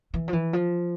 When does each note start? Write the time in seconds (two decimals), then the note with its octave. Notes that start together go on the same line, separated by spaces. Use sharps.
0.14 E3
0.28 F3
0.33 E3
0.53 F3